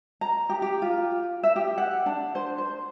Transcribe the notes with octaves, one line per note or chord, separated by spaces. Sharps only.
A#5
G4
G4
F4
E5
G4
F#5
D4
C5
C5